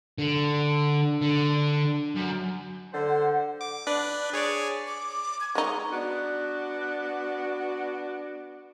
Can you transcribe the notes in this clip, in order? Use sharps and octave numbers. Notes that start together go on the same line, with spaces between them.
D3
D3
F#2
D3 C5
F#5
D6
D4 B4 D5
G#4 C#5 D5
D6
G#6
G#3 D#4 C#6
B3 D4 F#4